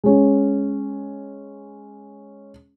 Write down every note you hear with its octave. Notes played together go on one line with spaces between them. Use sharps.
G#3 C#4